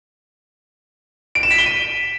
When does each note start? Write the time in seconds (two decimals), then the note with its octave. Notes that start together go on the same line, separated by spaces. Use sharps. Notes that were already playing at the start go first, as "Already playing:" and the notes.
1.35 D7
1.43 E7
1.51 B6
1.58 G7
1.66 D#7